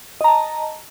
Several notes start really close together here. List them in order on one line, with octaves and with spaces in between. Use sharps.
D#5 A#5 A5